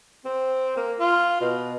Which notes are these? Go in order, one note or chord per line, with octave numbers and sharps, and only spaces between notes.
C4
A#3
F4
B2